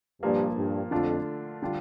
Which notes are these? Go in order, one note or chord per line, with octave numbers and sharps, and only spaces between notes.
G2 A#2 F3 A#3
G2
F2 D3 A3 D4 F4
D3 G3 D4 F4